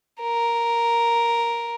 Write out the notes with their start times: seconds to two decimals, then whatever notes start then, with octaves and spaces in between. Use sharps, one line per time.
0.21 A#4